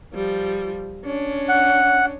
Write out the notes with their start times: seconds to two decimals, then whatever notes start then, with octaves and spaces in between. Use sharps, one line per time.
0.14 F3 G3
1.05 C#4 D4
1.49 F#5